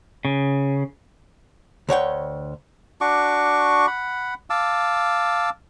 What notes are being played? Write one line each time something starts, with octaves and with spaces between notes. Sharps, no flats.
C#3
D2 C#5 F#5 G5
D4 F#4 C#6 D6
F#5 B5
F5 A5 D6 E6